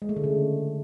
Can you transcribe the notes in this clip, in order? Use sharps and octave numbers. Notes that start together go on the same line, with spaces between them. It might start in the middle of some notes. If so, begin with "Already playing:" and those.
G#3
A3
D3
C#3